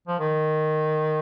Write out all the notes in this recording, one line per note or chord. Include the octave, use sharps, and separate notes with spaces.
F3
D#3